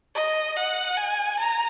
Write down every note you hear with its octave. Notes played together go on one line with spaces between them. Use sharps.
D#5
F#5
G#5
A#5